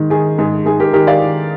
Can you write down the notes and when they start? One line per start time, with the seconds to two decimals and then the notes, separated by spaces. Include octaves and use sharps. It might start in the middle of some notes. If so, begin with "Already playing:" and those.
Already playing: G#2 D#3
0.10 D#3 G#4
0.38 G#2 G#4
0.66 G#2 G#4
0.80 G4 A#4
0.93 D#3 G4 A#4
1.07 D5 F5
1.22 D#3